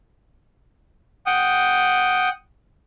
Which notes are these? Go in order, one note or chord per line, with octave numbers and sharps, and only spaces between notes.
F#5 G5 D#6